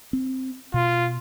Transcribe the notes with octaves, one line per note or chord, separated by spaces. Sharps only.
C4
B2 F4